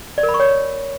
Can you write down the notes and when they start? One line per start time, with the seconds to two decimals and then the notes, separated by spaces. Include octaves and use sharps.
0.18 D5
0.23 A#4
0.29 B5
0.34 C#6
0.40 C#5